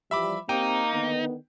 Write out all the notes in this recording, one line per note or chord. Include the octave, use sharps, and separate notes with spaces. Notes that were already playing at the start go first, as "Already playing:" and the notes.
E3 F3 G3 E5 B5 D6
A#3 C4 D#4 G4 G5
D3 D#3 B3